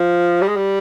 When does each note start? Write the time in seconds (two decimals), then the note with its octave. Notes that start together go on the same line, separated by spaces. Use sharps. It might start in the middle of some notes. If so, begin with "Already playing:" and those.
Already playing: F3
0.42 G3
0.48 G#3
0.56 G3